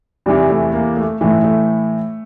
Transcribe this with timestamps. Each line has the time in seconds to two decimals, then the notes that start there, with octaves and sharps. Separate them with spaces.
0.26 E2 C3 E3 G3
0.50 A3
0.73 A#3
0.97 A3
1.21 A2 E3 A3
1.44 A3